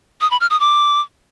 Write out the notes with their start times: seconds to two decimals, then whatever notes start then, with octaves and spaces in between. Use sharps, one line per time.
0.21 D#6
0.31 B5
0.41 F6
0.50 D#6
0.60 D6